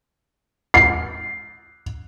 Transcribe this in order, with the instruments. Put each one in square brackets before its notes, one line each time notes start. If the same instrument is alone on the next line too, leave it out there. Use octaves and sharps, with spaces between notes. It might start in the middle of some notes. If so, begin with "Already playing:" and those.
[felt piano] C7